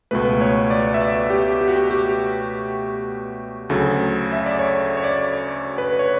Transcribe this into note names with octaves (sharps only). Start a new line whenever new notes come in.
C#2 B2 A3 B4
C#5
D5
E5
D5
G4
G4
F#4
G4
G4
D2 C#3 F#3 A4
E5
D5
C#5
C#5
D5
B4
C#5